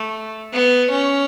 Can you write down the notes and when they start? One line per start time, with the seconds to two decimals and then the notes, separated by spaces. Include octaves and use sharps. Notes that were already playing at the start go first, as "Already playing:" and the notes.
Already playing: A3
0.53 B3
0.90 C#4